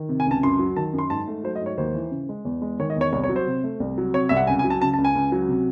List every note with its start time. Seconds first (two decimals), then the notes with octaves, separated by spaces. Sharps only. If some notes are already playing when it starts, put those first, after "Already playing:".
Already playing: D#3
0.09 C3
0.20 G#5
0.26 C#2 A5
0.43 F#2 C6
0.59 F#3
0.76 D#3 A5
0.93 F#2
0.98 C6
1.10 G#2 A5
1.28 A3
1.44 F#3 C5
1.56 D#5
1.62 G#2 C#5
1.77 D#2 C5
1.94 E3
2.11 C#3
2.29 G#3
2.45 E2
2.62 G#3
2.79 D#3 C#5
2.90 D#5
2.96 E2
3.01 C#5
3.12 C2 C#5
3.24 C#5
3.29 F#3
3.36 C5
3.47 C3
3.64 A3
3.80 C2
3.98 F#3
4.14 C3 C#5
4.29 C2 E5
4.37 F#5
4.47 C#2 G#5
4.59 G#5
4.64 F#3
4.70 A5
4.81 C#3 A5
4.94 A5
4.98 C#2
5.05 G#5
5.15 C#2
5.32 F#3
5.49 C3